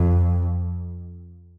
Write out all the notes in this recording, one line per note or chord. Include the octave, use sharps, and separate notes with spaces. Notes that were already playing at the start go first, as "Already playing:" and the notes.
Already playing: F2